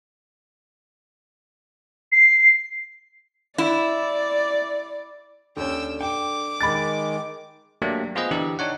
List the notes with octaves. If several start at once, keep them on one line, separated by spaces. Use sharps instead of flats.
C7
E4 D5
D#2 D3 C#4 G5 E6
G5 D6
D#3 G#3 B5 A6
F#3 A3 A#3 D4 G4
B3 F4 G#4 B4 C5 D#5
D3 E3 D4 G4
D4 D#4 C#5 F#5